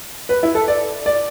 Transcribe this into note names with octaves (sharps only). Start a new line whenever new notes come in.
B4
E4
A4
D5
D5